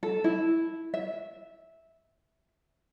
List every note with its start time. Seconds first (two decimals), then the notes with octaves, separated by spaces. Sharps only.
0.03 A4
0.24 E4
0.94 E5